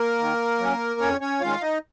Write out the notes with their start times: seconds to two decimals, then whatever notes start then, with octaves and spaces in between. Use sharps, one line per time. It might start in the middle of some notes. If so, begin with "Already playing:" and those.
Already playing: A#3 A#4
0.19 D#3
0.59 F#3 C#4
1.00 F2 C#4 C#5
1.20 C#4 C#5
1.41 D#3 G#3 C#4 F4 F5
1.61 D#4 D#5